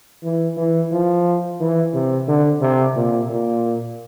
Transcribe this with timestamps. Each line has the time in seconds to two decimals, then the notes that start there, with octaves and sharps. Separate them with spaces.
0.24 E3
0.57 E3
0.92 F3
1.60 E3
1.94 C3
2.28 D3
2.61 C3
2.95 A#2
3.29 A#2